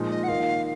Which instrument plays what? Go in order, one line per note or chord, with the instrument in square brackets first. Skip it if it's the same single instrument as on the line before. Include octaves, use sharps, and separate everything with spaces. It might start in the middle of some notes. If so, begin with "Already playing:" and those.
Already playing: [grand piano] A#2 F3 G#3 D#4
[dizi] D#5
F#5
[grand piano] D#3 A#3 F4 [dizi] F5